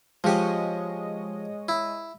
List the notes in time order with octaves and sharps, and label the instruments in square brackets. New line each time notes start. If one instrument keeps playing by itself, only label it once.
[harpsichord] F3 G4 [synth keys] G#3 C#5 D#5
[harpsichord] E4